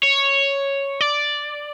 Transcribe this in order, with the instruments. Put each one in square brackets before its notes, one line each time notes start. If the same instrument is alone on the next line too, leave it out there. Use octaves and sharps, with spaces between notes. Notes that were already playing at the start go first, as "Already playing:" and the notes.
[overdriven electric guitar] C#5
D5